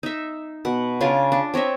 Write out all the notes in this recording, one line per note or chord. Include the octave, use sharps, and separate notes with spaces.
D#4 E5
B2 F#5
C#3 D4 F4 G#5
D4
C4 C#5 D#5 E5